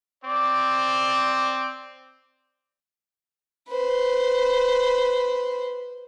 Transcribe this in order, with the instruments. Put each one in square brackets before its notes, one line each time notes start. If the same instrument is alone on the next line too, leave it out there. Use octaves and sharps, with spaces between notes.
[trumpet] C4 [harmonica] D5
[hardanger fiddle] B4 C5